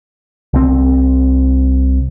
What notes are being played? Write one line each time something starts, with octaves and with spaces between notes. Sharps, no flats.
C2 C4